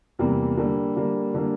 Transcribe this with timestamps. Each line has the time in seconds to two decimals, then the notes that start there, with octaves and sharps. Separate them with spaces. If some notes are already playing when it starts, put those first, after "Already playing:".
0.19 E2 C3 E3 G3 A#3
0.57 D3 G3 A#3
0.96 D3 G3 A#3
1.34 D3 G3 A#3